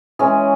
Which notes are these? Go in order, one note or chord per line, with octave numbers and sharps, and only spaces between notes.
E3 G#3 C#4 G#4